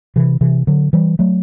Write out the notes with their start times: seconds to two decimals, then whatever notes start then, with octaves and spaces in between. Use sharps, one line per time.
0.16 C3 E3
0.41 C3 E3
0.67 D3 F#3
0.93 E3 G3
1.19 F#3 A3